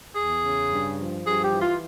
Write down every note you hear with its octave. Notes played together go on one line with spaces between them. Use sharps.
E2 G#4
C#3
G2
F3
G2 G#4
G4
E3
F4